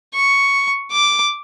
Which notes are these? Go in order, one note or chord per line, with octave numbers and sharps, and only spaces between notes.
C#6
D6